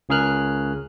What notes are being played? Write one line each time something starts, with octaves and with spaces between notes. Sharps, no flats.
C#2 C#3 G#4 A#4 F6 F#6